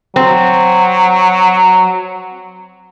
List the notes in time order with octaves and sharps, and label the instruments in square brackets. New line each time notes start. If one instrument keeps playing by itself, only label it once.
[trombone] F#3 [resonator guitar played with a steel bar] C4